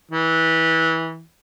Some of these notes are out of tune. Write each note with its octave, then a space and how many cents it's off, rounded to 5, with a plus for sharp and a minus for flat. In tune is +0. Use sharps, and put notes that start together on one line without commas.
E3 -20